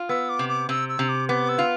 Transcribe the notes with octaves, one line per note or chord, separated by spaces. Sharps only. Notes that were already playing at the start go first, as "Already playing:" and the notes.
Already playing: F4
B3 E6
D6
C3
D6
C3 E6
E6
C3
D6
B3 D6
E6
F4